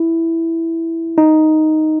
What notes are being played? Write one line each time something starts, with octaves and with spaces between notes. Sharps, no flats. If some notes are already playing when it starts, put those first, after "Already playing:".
Already playing: E4
D#4